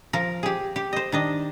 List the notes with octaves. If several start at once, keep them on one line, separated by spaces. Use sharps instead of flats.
F3 A#4
G4 G#4
G4
C5 D#5
D#3 D4 D#5